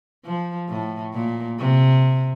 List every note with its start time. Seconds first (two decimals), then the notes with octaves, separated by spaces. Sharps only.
0.25 F3
0.69 A2
1.14 A#2
1.59 C3